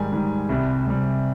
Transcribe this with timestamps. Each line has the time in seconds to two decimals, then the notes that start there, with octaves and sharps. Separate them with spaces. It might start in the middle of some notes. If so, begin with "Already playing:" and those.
Already playing: G#2 D#3 G3 G#5
0.13 G#2 D#3 G3
0.49 C2 C3 G3
0.86 C2 C3 G3